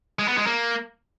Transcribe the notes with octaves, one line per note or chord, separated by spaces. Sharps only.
G#3
B3
G#3
A#3